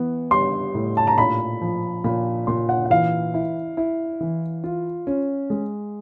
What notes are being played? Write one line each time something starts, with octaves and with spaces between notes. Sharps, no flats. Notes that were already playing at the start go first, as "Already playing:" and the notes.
Already playing: E3 B3
G3 C6
A2
A5
A#5
A#2 B5
F3
A#2 B5
A#2 C6
F#5
F#5
E3 F5
E4
E4
E3
F4
C#4
G#3